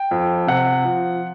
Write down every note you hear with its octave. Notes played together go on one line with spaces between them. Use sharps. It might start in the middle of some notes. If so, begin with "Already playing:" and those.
Already playing: G5
F2
C3 F#5
F3